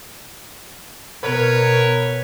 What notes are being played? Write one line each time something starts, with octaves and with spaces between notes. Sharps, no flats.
B2 A#4 B4 C#5